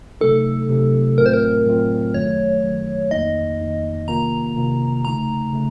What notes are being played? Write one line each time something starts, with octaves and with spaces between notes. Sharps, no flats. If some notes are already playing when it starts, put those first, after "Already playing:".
C3 F#3 A3 D#4 A4
C3 F#3 A3 D#4
A2 F#3 A3 C4 F4 A#4
C5
A#4
A2 F#3 A3 C4 F4
F#2 D#3 F#3 A3 C#5
F#2 D#3 F#3 A3
F2 D#3 A#3 D#4 D#5
F2 D#3 A#3 D#4
C3 D#3 A#3 F4 A#5
C3 D#3 A#3 F4
C#3 A3 D#4 A#5
C#3 A3